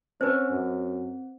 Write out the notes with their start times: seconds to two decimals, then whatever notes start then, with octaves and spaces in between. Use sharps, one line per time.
0.21 C4 C#4 B4 C5
0.50 F#2